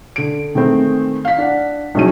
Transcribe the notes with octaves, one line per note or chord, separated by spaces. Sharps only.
D3 D7
D#3 G#3 A3 C4
F5 B6
D4 F#5
A#1 F#3 G#3 C#4 D#4 D#7